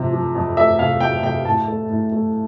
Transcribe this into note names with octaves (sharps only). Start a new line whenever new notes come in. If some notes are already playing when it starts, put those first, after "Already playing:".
Already playing: C3 F3
F3
F2
A3 E5
C3 F5
C3 G5
C3 G5
A2 A5
A3
A2
A3